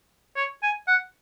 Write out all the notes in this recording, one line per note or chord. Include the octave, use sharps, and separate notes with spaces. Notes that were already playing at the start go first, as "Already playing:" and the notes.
C#5
G#5
F#5